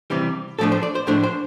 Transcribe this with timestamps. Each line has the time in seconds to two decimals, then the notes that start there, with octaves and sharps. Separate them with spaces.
0.10 C3 E3 G3
0.59 A2 F3 A3 D4 A4
0.72 C5
0.83 D5
0.95 C5
1.07 A2 F3 A3 D4 C5
1.23 C5